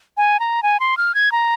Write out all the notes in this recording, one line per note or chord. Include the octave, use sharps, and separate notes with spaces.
G#5
A#5
G#5
C6
F6
G#6
A#5